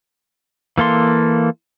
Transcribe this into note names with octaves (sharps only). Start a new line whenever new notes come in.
E3 A#3 A4 C6